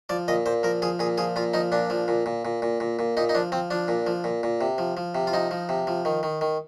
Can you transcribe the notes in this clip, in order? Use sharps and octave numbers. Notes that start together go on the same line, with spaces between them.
F3 D5
A#2 D#5
A#2 C5
F3 A#4
F3 G#4
A#2 G#4
F3 G#4
A#2 F4
F3 D#4
A#2 D4
F3
A#2
A#2
A#2
A#2
A#2
A#2
A#2 D#4
D#4
F3 D4
F3 C4
F3 D4
A#2
F3
A#2
A#2
C3
F3
F3
C3
F4
F3 D#4
F3
C3
F3
D#3
D#3
D#3